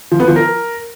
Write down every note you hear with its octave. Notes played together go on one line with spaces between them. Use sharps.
F3
B3
F3
A#4